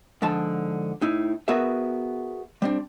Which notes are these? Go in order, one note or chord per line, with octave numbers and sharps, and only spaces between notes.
G#2 D3 F3 A5
A2 D#4 E4
B3 F#4 G#4 A#4 B4 E5
G3 C4 D4